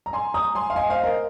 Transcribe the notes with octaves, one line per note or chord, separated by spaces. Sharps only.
A#5
G#5 C6
A#5 D#6
G#5 C6
F5
D#5 G#5
C5 F5
A#4 D#5